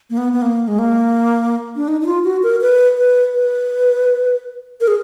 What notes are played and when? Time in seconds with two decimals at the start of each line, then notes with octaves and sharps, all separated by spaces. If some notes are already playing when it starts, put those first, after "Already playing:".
0.10 A#3
0.17 B3
0.33 B3
0.42 A#3
0.68 G#3
0.79 A#3
1.76 D4
1.88 D#4
2.01 D#4
2.06 F4
2.24 F#4
2.43 A#4
2.61 B4
2.98 B4
3.34 B4
4.81 A#4
4.88 G#4